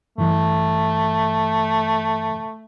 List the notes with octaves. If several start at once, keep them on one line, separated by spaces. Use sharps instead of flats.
G2 E3 A3